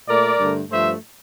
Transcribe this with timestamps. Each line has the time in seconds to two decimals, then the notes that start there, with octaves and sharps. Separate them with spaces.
0.08 A#2 A3 A#4 D5
0.39 G2 D3 A3
0.70 G2 F3 A3 C5 E5